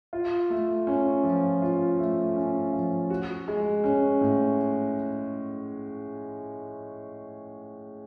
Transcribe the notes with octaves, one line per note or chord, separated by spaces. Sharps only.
F4
A3
C#4
F3
F4
A3
C#4
F3
F#4
G#3
C#4
A2